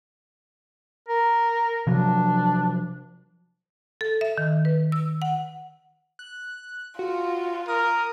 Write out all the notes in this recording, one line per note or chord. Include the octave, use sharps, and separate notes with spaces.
A#4
C3 F3 F#3 D4
A4
E5
D#3
B4
E6
F#5
F#6
F4 F#4
A#4 D#6